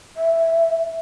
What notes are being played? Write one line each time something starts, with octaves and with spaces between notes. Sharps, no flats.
E5